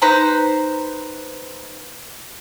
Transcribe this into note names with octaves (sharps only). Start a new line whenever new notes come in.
D#4 B4 C5 A#5